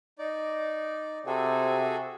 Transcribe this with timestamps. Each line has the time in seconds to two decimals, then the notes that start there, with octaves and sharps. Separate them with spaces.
0.18 D#4 D5
1.27 C3 F#4 G#4 A4